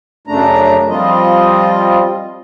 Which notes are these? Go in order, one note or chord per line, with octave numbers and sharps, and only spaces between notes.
F#2 C#3 A3 D4 A#5
F3 G3 C4 F4 D#5